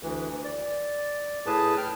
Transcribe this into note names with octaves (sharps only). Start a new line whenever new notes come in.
D2 E3
D5
A2 G#4 B4 A5
G5 F6